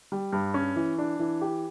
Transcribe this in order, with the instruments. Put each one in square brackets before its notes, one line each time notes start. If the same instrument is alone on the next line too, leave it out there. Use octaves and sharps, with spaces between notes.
[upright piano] G3
G2
C#4
E3
D4
E3
G4